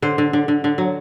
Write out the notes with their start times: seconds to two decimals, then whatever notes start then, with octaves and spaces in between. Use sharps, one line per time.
0.02 D3 C5
0.18 D3
0.33 D3
0.48 D3
0.64 D3
0.78 F#3